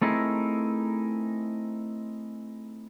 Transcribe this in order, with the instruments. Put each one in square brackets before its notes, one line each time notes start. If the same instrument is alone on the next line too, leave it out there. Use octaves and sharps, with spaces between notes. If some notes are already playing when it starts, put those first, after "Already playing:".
[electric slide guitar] A3 C4 D#4 E4 G#4 A#4